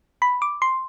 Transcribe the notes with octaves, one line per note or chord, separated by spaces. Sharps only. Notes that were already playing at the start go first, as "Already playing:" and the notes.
B5
D6
C6